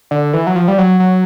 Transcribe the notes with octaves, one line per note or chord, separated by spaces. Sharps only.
D3
E3
F#3
F3
G3
F#3
F#3